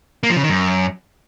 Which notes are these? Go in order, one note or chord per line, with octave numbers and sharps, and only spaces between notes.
A#3
F3
C#3
D#3
F#2